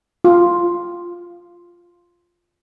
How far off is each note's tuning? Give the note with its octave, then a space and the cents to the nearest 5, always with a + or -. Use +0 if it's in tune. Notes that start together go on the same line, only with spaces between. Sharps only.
F4 +0